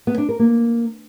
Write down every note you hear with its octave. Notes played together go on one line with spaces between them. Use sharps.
B3
D4
A#4
A#3